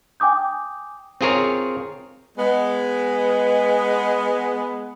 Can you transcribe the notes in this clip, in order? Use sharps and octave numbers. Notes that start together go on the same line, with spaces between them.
G5 G#5 D6 D#6 G6
C4 F4 G#4 A#4 C#5
G#3 B3